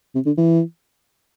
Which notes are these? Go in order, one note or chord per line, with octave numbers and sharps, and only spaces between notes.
C3
D3
E3